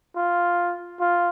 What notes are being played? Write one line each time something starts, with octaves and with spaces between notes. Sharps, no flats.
F4
F4